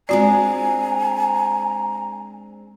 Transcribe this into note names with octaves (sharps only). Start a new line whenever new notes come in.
G#3 C4 D4 F4 F#4 D5 G#5 A#5